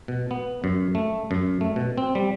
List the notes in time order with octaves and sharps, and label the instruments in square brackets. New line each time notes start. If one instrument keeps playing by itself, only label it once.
[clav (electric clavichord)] B2
B3
F#2
A3
F#2
A3
B2
C4
G3